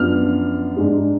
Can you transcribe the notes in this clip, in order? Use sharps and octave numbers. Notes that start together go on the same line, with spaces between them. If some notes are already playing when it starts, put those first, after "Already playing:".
Already playing: F#2 F3 B3 D4 F6
G#2 G#3 D4